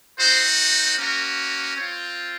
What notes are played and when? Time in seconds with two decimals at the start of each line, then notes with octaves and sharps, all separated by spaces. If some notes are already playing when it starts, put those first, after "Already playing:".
0.19 C4 D#4 F#4 C5
0.98 A#3 C#4 F#4 A#4
1.76 C4 F4 C#5